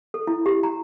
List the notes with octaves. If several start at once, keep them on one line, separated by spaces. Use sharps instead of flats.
A4
E4
G4
A#5